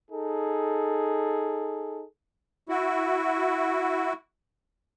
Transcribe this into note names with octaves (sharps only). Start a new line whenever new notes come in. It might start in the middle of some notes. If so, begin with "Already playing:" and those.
D#4 G#4 A4
E4 F#4